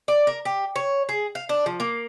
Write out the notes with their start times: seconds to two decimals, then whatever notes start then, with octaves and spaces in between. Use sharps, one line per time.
0.08 D5
0.27 A#4
0.45 G4
0.76 C#5
1.09 G#4
1.35 F5
1.49 D4
1.66 F3
1.80 A#3